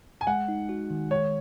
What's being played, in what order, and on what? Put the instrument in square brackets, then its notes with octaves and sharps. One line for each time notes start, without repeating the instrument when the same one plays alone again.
[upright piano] G#5
[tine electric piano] G#3 [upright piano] F#5
[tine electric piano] D#4
F#4
D#3
[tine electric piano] G#3 [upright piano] C#5